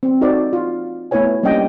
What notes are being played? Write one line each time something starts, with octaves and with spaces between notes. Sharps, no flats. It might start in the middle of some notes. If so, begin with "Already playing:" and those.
C4
D#4 F#4 A4 C5 D5
F4
A3 B3 E4 B4 C#5 G#5
G3 A#3 C#4 D4 D#5 G5